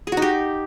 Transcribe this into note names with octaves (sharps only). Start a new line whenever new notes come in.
G#4
F#4
D#4
G4